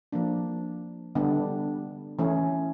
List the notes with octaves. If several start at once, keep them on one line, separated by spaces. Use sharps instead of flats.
F3 A#3 D4
D3 G3 B3 D4
E3 A3 C#4